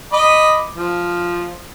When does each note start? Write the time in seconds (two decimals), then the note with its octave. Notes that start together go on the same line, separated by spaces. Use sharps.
0.13 D#5 B5 D6
0.75 F3